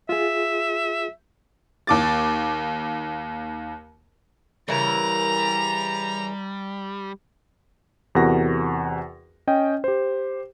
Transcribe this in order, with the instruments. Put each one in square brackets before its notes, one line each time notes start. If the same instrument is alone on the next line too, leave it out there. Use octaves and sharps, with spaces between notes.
[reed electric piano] F4 G#4 [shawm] E5
[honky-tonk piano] D#2 D6 A6
[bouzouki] C#3 E3 A#4 [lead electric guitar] G3 [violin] A#5 F7
[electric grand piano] E2 C3 F#4 A#4 F#5 A#6
C#4 D#5 G5
G4 C5